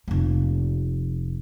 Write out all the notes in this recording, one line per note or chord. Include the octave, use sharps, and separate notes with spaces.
F1 A#3